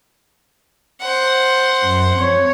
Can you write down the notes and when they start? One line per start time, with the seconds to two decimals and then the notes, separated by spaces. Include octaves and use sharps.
1.01 C5 F#5
1.83 F#2
2.16 F2 C#5